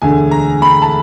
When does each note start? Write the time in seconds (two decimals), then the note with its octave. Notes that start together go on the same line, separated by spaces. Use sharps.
0.02 E1 D2 D3 G#5
0.31 A#5
0.62 B5
0.82 A5